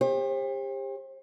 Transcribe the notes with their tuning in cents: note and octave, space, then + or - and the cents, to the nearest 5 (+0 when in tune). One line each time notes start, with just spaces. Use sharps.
G4 +35 C5 +40